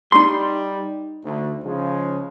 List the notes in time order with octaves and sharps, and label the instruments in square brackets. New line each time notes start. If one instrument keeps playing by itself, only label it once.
[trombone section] G3 [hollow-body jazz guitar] D#4 C6
[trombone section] D2
C#3 F3 G#3